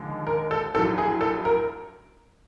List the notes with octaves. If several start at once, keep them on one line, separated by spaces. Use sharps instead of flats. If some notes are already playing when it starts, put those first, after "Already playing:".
Already playing: D#2 D3 F3 G#3
A#4
A4
A#1 A2 F#3 A4
G#4
A4
A#4